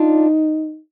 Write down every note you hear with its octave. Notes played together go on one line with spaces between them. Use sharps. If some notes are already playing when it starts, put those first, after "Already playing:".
Already playing: D4 D#4 F4